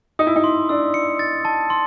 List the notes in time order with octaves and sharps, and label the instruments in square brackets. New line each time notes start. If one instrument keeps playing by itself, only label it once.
[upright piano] D#4 [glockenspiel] D#6
[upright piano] E4
D#4
[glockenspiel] C6
[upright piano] D4 [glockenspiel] E6
[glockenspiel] C#7
A6
A5
C6